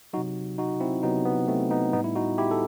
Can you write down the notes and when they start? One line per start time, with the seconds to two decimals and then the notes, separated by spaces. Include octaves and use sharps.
0.13 F#3 D#4 F#4
0.18 C3
0.58 D#4 F#4
0.80 C4 E4
1.03 C3 F#3 B3 D#4
1.25 B3
1.48 A3 C4
1.71 B3 D#4
1.93 A2 G3 B3 D#4
2.04 E4
2.15 D#4 F#4
2.38 E4 G4
2.51 A4